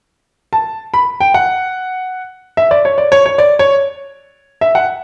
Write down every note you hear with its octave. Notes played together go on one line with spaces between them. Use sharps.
A5
B5
G5
F#5
E5
D5
C#5
D5
C#5
C#5
D5
C#5
E5
F#5